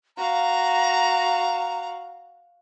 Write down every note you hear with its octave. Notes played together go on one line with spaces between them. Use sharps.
F#4 F5 A#5